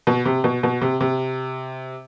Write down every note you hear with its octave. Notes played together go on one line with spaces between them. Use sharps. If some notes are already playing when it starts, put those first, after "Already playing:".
B2
C3
B2
B2
C3
C3